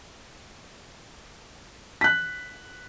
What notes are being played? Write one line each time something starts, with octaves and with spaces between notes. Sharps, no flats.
F#6 B6